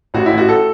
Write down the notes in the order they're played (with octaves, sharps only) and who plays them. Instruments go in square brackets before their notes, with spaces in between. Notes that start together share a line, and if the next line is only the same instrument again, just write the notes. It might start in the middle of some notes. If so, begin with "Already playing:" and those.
[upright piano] A1 F#4
E4
A1
F#4
A4